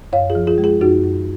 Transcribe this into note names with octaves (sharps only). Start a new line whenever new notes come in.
F#2 C#5 F5
F4 G#4
F3
F4 G#4
G#3
F4 G#4
F#2 D#4 F#4
F#2